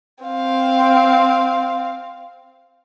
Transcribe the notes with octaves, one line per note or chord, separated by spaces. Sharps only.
C4 F5